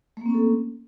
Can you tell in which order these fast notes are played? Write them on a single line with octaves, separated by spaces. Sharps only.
A3 A#3 C4 C#4 A4